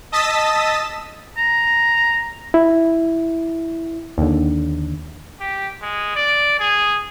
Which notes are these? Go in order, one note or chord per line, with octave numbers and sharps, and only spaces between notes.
D#5 A5 D#6 E6 A6 B6
A#5
E4
D#2 D3
G4
G#3
D5
G#4